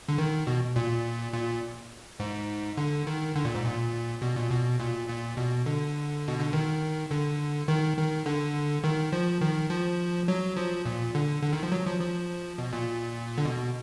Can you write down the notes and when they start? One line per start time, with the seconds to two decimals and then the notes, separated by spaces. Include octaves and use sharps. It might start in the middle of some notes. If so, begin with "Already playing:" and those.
0.09 D3
0.18 D#3
0.47 B2
0.76 A#2
1.34 A#2
2.20 G#2
2.77 D3
3.07 D#3
3.35 D3
3.45 A#2
3.55 G#2
3.64 A#2
4.22 B2
4.36 A#2
4.51 B2
4.80 A#2
5.08 A#2
5.37 B2
5.66 D3
6.28 B2
6.40 D3
6.53 D#3
7.11 D3
7.68 D#3
7.97 D#3
8.26 D3
8.84 D#3
9.13 F3
9.41 D#3
9.70 F3
10.28 F#3
10.57 F3
10.85 A#2
11.15 D3
11.43 D3
11.53 D#3
11.63 F3
11.72 F#3
11.87 F3
12.01 F3
12.58 B2
12.73 A#2
13.38 D3
13.45 B2